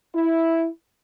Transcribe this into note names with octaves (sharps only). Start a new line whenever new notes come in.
E4